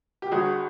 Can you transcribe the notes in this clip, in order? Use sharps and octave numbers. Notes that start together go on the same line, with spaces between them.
G4
G1 F#4 G#4